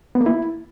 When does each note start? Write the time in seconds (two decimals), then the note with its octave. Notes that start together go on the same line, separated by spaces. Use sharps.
0.15 B3
0.21 A#3
0.26 E4